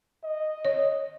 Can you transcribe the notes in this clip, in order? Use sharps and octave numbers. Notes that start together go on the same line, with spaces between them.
D#5
C#5